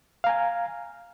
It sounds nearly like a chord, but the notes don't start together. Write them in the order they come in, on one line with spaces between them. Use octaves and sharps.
F5 A#5 G#5